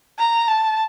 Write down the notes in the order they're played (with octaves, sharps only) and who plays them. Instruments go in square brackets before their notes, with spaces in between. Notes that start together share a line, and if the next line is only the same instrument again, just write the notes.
[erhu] A#5
A5